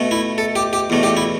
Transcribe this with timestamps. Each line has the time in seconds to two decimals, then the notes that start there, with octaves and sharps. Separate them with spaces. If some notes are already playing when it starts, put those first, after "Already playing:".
Already playing: B2 A3
0.11 E4
0.38 A4
0.56 G4
0.73 G4
0.90 E2 B2 A3
1.03 G4
1.17 E4